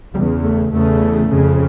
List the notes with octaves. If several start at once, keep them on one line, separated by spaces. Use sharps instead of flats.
E2 C#3 G3
A3
E2 C#3 A3
F2 C#3